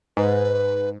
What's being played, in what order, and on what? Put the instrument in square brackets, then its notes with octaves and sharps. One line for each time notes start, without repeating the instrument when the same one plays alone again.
[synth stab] G#2 [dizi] B4